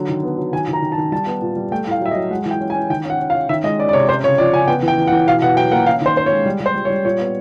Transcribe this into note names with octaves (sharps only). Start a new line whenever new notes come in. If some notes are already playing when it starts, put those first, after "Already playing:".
Already playing: D3 F#3
D#3
B3
F#3
D#3 G#5
D#3
A#5
D#3
A5
D#3
G3 A5
B3
A#2
G3
A3 G5
A2 F5
F#3 E5
D#5
F#3
G#3 F#5
E3
G5
C#4
G#5
C#4
D#3 G5
C#4 F#5
C#4
F5
C#4
D#3 E5
G#3 D#5
C#4 D5
D5
C3 C#5
C#4 C5
C#3 C#5
F3 D5
C#3 G#5
B3 G5
E3
G5
E3
F#5
E3
B2 F5
B2 F#5
F#3 G5
A#3 F#5
C#4 F5
D#3 C5
C#4 C5
C#5
G#3
G3
G3
C5
G3
C#5
G3
A#2 C#5
B3